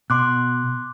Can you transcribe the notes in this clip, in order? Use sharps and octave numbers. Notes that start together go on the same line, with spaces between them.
B2 C6 D6 F#6